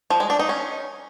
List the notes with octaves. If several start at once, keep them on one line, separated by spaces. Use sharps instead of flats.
F3
G#3
D4
D#4
C#4